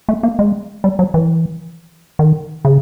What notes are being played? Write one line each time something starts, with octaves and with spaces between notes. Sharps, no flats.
A3
A#3
G#3
G3
F#3
E3
D#3
C#3